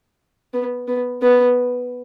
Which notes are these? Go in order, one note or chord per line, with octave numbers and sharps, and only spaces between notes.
B3
B3
B3